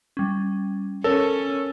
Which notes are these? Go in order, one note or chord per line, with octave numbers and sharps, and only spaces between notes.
G3 C#4
C#4 A4 A#4 C#5